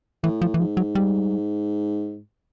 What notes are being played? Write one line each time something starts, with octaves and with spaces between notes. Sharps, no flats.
A2 E3
F3
E3
G#2 F3
F#3
G3